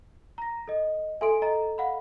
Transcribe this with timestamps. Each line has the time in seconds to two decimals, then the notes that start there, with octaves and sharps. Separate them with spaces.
0.38 A#5 A#6
0.68 A4 D#5
1.21 A4 E5 G#5 C6 D7
1.42 D#5 A#5
1.78 F5 F#5 B5